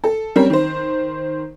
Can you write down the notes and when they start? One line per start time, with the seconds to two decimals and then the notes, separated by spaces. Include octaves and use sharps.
0.04 A4
0.36 G3 C4 C#4 A#4
0.50 D#3 C5